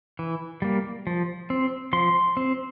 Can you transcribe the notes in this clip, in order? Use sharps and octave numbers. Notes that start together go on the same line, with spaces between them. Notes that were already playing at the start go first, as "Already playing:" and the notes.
E3
G3 A#3
F3
C4
F3 C6
C4